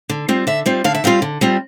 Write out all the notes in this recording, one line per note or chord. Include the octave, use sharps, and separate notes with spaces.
D3
G3 C4 F4
D3 E5
G3 C4 F4
D3 F5
E5
G3 C4 F4 F5
D3
G3 C4 F4